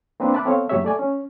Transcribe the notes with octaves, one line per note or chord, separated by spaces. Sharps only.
A#3 C4 D4 B4
E5 A5 B5 D6 F#6
B3 C4 A4 C#5 F5
F#2 A#2 F#3 G4 C#5 E5
A3 D5 G#5
C#4